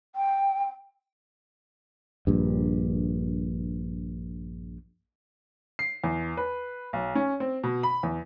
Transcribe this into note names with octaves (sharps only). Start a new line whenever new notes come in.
G5
A#1 G2
C7
E2
B4
B1
C#4
C4
B2
B5
E2